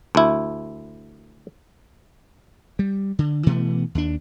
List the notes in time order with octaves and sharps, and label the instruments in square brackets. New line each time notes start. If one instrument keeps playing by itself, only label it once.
[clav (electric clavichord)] D2 E4
[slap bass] G3
D3
B2 E3 A3 B3
D#2 D4